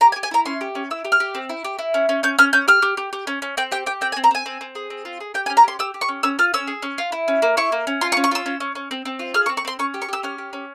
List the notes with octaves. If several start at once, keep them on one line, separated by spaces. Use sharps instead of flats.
G4 A#5
G#5
G4
G#5
E4 A#5
C#4 C6
G4
C#4
E4 E6
G4
F6
G4
C4
E4
G4
E4
C#4
C#4
C#4 G6
C#4 F6
C#4 G6
G4 F6
G4
G4
G4
C#4
C#4
C4 G5
G4 G5
G4 G5
C4 G5
G#5
C4
A#5
C4 G#5
C4
C4
G#4
C4
F4
G#4
G4 G5
G#5
C#4
A#5
G4 C6
G4 E6
G4
C#6
C#4
C#4 E6
F4 F6
C#4 E6
G#4
C#4
F4
E4
C#4
A#3
E4 C#6
A#3
C#4
F4 C6
C#6
C#4
C#6
F4 E6
C#4
C#4
C#4
C4
C4
F4
G#4 F6
C#6
C4
C#6
C4 C6
C#4 C#6
G4
C#6
G4 E6
C#4 F6
G4
C#4